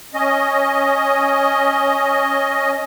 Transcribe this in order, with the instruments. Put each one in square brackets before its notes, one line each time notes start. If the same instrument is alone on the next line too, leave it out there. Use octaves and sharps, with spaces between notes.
[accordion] C#4 D#5